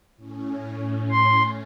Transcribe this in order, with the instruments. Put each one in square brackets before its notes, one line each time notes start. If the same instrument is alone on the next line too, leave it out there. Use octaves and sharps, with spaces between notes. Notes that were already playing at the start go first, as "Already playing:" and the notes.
[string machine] A2 C#4
[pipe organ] C6